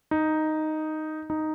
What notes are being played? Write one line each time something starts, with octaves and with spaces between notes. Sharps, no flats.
D#4
D#4